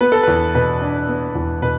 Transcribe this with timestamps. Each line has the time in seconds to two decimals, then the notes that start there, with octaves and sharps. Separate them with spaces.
0.01 B3 B4
0.12 A4
0.23 E2 B4
0.55 B2 B4
0.82 D4
1.08 B3
1.35 E2
1.62 B2 B4